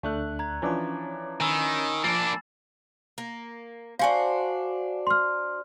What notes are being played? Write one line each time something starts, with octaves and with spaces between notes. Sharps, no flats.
D2 A3 D4 F#6
A#5 G#6
E3 F3 C#4 D4 C#5
D#3 G#5 B5 E6
F3 A#3 D4 A6 C7
A#3
D4 F#4 C5 F5 G#5
C6 F6